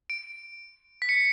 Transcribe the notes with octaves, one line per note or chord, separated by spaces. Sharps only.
D7
B6
C#7